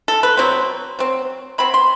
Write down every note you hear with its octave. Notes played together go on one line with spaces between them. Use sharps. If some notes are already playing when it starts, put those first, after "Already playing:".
A4
B4
B2 F#3 C4
F#3 C4
F#3 C4 B5
C6